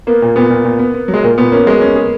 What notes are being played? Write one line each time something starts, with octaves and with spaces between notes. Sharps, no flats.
A#3 B3
A#2
A#2 B3
A#2
A#2
B3
B3
F#3
G#3
A#2 A#3
A#2 B3
A#3 C#4
F#3 G#3
C#4
G#4